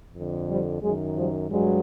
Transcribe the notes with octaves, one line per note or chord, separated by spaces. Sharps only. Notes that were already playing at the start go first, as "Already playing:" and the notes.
F2 D3
F3 G3
F#2 D#3 F#3 G#3
F3 G3
G2 F#3 G#3